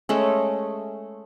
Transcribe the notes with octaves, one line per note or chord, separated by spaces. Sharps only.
G#3 A3 C#4